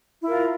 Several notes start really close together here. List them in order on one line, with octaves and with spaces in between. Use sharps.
E4 A#4 F4